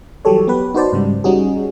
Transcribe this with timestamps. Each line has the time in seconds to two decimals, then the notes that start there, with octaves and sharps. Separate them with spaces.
0.25 E3 F#3 G3 G4 A4 C#5
0.48 B3 G4 B4
0.74 D#4 F#4 B4 C5 D5 A5
0.93 G#2 C#3 G3
1.24 G3 C#4 D#4 F#4 G#4